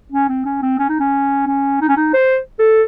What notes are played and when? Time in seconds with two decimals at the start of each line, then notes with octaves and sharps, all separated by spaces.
0.12 C#4
0.29 C4
0.45 C#4
0.62 C4
0.79 C#4
0.89 D#4
1.00 C#4
1.47 C#4
1.81 D#4
1.89 C#4
1.97 D#4
2.14 C5
2.59 A4